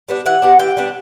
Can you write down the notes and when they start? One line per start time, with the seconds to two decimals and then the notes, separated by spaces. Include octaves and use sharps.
0.09 G3 B3 D4
0.26 E3 F#5
0.42 G3 B3 D4
0.59 E3 G5
0.77 G3 B3 D4